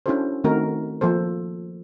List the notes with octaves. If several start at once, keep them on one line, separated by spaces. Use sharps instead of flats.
C#4 D4 E4 F#4 A4 C5
D#3 A3 C4 D#4 F#4 A#4
F3 A#3 A4 C5